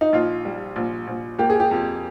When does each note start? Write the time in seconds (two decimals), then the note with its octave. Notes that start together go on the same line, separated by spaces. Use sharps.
0.01 D#4
0.13 A#1 F4
0.45 G3
0.76 A#1
1.07 A#1
1.39 A#3 G4
1.50 G#4
1.60 G4
1.71 F2